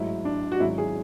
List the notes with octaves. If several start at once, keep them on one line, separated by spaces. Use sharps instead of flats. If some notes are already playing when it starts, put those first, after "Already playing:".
Already playing: A1 G#2 F#3 E4
D4
F#4
G#1 G#2 F#3 C#4 E4
G#4